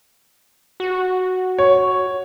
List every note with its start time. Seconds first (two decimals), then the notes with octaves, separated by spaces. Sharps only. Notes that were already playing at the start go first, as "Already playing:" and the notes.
0.80 F#4
1.58 C#5